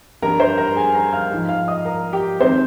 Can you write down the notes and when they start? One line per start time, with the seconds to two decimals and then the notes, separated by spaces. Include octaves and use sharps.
0.22 G2 G3 A#4 A#5
0.40 C5 C6
0.58 A#4 A#5
0.76 G#4 G#5
0.94 A#4 A#5
1.13 F5 F6
1.31 G#2 F3 G#3
1.49 F5 F6
1.68 D#5 D#6
1.85 A#4 A#5
2.13 G4 G5
2.40 D#3 G#3 C4 C5